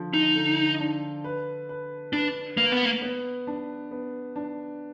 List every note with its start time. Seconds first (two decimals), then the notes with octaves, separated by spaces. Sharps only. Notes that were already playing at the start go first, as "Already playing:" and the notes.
Already playing: D3 F3
0.14 D#4
0.35 D3
0.80 D4
1.24 B4
1.69 B4
2.13 D4 B4
2.57 A#3 B4
2.72 B3
2.85 A#3
3.02 B3
3.47 D4
3.91 B3
4.36 D4